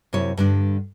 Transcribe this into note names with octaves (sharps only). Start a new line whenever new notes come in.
F#2 C3 E4 C#5
G2 D3 D4